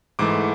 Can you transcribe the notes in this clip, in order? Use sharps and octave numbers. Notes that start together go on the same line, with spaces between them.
G#2 E3 A3 D6